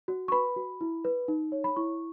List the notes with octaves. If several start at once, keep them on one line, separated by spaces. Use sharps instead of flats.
F#4
C#6
B4 B5
F#4
E4
B4
D#4
C#5
B5
E4 C#6